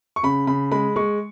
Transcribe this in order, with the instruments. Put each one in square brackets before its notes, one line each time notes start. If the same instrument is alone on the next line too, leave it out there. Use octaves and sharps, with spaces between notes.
[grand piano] C#6
C#3 B5
C#3 B5
G#3 B5
G#3 C#6